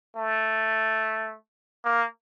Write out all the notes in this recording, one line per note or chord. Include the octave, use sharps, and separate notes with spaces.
A3
A#3